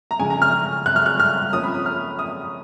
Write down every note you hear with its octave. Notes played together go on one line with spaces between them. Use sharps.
A#5
F2 C#3 G#3 G#5
A#5
F6
F#6
F6
F#6
F6
F2 F3 A#3 C#4 D#6
B5
D#6
F6
D#6